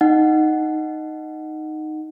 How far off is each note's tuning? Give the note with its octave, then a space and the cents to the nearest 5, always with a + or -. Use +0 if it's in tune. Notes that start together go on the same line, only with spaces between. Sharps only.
D#4 -5 F#5 +0